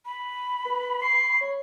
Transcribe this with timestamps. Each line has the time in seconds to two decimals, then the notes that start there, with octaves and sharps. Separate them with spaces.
0.05 B5
0.65 B4
1.02 C#6 C7
1.41 C#5